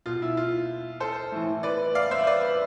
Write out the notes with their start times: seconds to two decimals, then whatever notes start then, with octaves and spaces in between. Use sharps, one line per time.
0.06 B2 F4
0.22 E4
0.37 F4
1.00 A4 C5
1.32 A2 E3
1.63 B4 D5
1.95 D5 F5
2.11 C5 E5
2.27 B4 D5